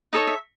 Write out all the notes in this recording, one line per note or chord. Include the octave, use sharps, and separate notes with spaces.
D#4 A4 C#5 D#5
E5